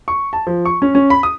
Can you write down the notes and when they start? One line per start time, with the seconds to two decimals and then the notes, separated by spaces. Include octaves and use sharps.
0.08 C#6
0.33 A5
0.47 F3
0.65 C#6
0.82 C#4
0.95 C#4
1.10 B5
1.23 D#6